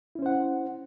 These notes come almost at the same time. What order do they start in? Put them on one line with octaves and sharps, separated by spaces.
E4 C#4 C5 F#5